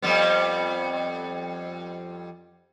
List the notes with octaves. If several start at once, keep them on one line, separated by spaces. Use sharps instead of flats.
F2 G3 B3